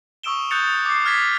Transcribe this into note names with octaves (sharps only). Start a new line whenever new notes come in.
C#6 D#6 E6 D7 E7 G7
D#6 F#6 G6 A6 C#7 F7
D6 C7
F6 G#6 A6 B6